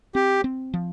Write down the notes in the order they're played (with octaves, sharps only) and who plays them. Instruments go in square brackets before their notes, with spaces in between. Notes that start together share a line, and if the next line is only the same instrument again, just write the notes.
[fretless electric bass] C4 [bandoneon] G4
[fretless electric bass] C4
F3